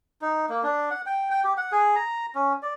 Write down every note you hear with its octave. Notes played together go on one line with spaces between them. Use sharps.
D#4
A#3
D4
F#5
G5
G5
G4
F#5
G#4
A#5
C#4
D5